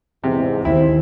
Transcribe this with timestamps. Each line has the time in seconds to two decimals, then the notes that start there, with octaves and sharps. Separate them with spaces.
0.24 E2 G#2 C3
0.65 D#2 C4 E4